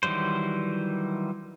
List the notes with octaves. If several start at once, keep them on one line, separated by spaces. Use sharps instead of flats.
D#3 E3 F#3 G3 C5